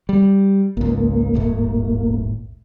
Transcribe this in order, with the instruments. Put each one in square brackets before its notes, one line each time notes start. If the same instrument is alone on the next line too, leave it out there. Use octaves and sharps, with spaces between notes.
[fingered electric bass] G3
[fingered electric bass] G#1 C#2 [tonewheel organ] A#3
[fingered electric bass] D#1 G#1 A2